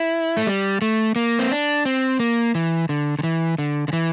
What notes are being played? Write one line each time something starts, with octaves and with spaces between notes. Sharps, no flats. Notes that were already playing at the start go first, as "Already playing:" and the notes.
Already playing: E4
A3
G3
A3
A#3
C4
D4
C4
A#3
E3
D3
D3
E3
D3
D3
E3